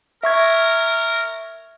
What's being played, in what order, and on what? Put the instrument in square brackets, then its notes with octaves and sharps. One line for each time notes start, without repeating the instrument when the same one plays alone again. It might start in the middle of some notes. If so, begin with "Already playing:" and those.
[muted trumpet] A#4 [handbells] E5 C#6 G#6